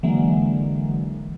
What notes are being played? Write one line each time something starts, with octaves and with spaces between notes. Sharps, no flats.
D3 E3 F#3 G#3 A#3